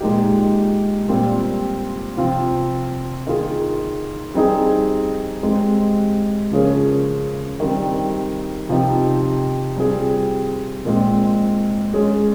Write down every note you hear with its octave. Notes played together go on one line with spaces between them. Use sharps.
A#2 G#3 D#4 G4
A#2 G3 C4 F4
C3 F3 C4 F4
D#3 A#3 F4 G#4
G3 C4 D#4 G#4
G#3 C4 G4
C#3 F3 A#3 C#4 G#4
D#3 G3 C4
C3 F3 C4 D#4 G4
G3 C4 F4 G#4
A#2 G#3 C4
G#3 C#4 G#4